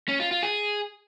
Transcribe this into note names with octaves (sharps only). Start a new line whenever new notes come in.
C#4
F4
F4
G#4